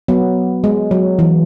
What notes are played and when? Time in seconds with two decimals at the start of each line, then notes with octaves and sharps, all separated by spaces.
0.08 F#3 B3
0.64 G#3
0.91 F#3
1.19 E3